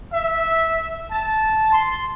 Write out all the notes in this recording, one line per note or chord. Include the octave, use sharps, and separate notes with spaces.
E5
A5
C6